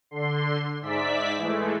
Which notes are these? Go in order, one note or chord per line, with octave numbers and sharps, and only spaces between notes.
D3 C6
G#2 D5 E5 B6
E3 G#3 A3